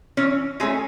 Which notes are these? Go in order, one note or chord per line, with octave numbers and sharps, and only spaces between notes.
E3 C#4 C#5
G#3 A3 C#4 G#4